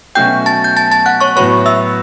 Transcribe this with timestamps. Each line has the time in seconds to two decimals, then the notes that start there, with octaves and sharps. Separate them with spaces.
0.15 B2 F#3 A3 C#4 F#4 G5 G6
0.46 A5 A6
0.64 G6
0.77 A5 A6
0.92 A5 A6
1.06 F#5 F#6
1.21 C#5 C#6
1.36 A2 F#3 B3 F#4 B4 C#5 C#6
1.66 E5 E6